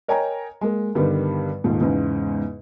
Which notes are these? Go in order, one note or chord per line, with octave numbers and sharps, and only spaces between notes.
A#4 C#5 D#5 G5 G#5 A#5
G#3 A#3
G2 D3 D#3 G3 B3
D#1 G#2 F4
E2 G#2 C#3